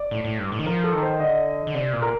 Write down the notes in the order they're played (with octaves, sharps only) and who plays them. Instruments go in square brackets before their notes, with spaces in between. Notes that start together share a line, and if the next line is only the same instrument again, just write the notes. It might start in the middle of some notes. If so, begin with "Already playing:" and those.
Already playing: [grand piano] D5
[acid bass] A2
A2
G2
A2
D#3
[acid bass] F3 [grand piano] A#4
[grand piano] A4
[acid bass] D#3
[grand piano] C5
[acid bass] D3 [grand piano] D#5
[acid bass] D3
[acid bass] C3 [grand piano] D5
[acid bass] A#2
[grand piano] A#4